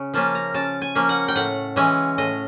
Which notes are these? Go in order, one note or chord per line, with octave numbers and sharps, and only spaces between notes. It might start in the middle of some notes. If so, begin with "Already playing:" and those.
Already playing: C#3
F3 A#3 C#4 A5
A#5
C#3 A5
G#5
F3 A#3 C#4
F#5
G5
A2 F#5
E3 G#3 C#4
A2 D#5